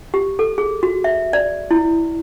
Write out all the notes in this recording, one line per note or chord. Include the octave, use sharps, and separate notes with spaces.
G4
A4
G#4
F#4
E5
D5
E4